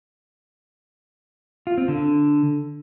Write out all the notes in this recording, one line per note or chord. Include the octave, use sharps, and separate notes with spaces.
F4
C4
D3